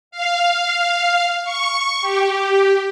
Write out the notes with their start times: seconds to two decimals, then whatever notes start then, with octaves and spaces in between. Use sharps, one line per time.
0.11 F5
1.44 C#6
2.01 G4